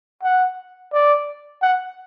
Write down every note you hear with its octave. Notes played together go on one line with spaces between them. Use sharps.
F#5
D5
F#5